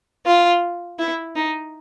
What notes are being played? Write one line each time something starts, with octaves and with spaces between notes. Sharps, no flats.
F4
E4
D#4